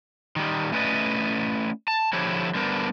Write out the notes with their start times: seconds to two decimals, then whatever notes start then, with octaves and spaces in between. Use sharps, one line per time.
0.36 D#3 G3
0.72 A3 C#4 E4 B4 D5 D#5
1.88 A5
2.13 D3 F3 E4 G4 C#5
2.55 D3 G3 B3 D4 A#4 C5